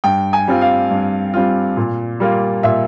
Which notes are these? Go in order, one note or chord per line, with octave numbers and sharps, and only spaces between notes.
G2 G5
G#5
G3 C4 F4
F5
G2
G3 C4 F4
A#2
G3 A#3 F4
A#2 E5